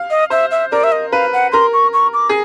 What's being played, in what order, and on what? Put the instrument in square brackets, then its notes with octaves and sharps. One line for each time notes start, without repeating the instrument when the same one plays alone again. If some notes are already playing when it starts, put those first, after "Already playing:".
Already playing: [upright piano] F5
[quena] D#5
[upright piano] C5 [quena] E5
[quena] E5
[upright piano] A#4 [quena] D5
[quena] E5
D#5
[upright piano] B4 [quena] F5
[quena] F#5
[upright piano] A#4 [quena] C6
[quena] C#6
C#6
D6
[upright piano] G#4